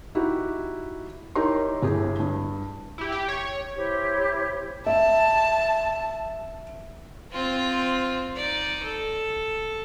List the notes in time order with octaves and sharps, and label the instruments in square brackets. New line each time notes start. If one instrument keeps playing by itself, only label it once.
[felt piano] D#4 E4 F#4 G4
D#4 E4 G4 A#4 C#5 C6
G1 A2 G4 G#4
G2
[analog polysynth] E4 G4
G4
C#5
[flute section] E4 G4 C5 C#5
[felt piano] E5 [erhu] A5
[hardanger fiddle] C4 F4
D#4 D5
A4